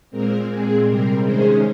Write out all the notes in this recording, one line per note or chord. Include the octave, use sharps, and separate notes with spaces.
A#2 G#3 C4 A#4
A#2 G#3 C4 G#4
C3 G3 C4 A#4
C3 D#3 G#3 C#4 G#4 C5